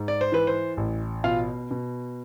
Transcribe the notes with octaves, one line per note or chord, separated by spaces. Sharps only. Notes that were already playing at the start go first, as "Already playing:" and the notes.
Already playing: G#2
D5
C5
E3 B4
C5
A1
B2 F4 F5
B2